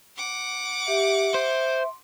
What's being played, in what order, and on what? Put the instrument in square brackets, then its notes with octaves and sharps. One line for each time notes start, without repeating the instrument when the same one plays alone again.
[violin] F#5 D6
[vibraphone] G4 [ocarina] E5
[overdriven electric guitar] C5 [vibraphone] C6